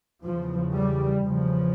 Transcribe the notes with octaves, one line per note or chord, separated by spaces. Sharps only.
E2 C#3 F3
G3
E2 C#3 F3